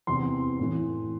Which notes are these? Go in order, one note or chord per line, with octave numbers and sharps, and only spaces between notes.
E2 C3 E3 C6
A2 E3